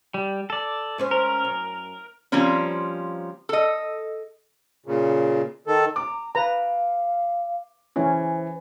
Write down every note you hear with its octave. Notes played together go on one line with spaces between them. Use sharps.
G3
A4 D5
G#2 C#4 C5
A#4
F#2
F3 G3 A#3 C4 C#4
A4 D#5
A#2 C#3
D#3 A4
A#5 D6
B4 F5 A#5
E3 C#4 C5